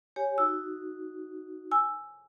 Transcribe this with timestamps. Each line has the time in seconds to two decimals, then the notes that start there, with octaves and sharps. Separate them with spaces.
0.16 G4 C#5 G#5
0.38 D#4 F#4 E6
1.71 G#5 E6